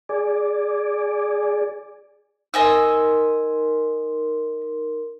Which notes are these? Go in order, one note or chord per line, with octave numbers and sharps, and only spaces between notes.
G#4 D5
D#4 A#4 D#5 G#5 C6 E6